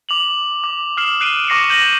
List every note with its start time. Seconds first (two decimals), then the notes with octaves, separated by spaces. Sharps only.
0.09 D6 F7 F#7
0.64 D6
0.97 D#6 F6 C7 E7 F#7
1.21 F#6 C7 D7 D#7 G7
1.47 C#6 D6 A#6 C7 C#7 D#7
1.70 G6 A#6 D#7 F#7